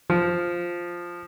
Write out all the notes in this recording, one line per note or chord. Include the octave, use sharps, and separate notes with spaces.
F3